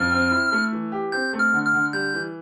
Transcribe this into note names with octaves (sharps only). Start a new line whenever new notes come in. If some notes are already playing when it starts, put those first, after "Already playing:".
Already playing: F2 F6
C4
E4
A3
E3
G4
C4 G6
A3
F6
D3
F6
D3
G3 G6
E3